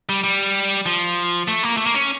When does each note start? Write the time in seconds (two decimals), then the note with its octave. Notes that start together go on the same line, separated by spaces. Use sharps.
0.09 G3
0.24 G3
0.86 F3
1.48 A3
1.63 A#3
1.77 A3
1.86 A#3
1.94 C#4